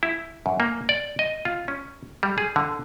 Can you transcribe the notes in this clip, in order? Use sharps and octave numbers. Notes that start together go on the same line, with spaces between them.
E4
F#2
A#3
D5
D#5
F4
C#4
G3
G#4
D3